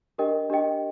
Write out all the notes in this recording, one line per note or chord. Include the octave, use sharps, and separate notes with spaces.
D4 G4 A#4 D#5 G5
D4 G4 A#4 D#5 G5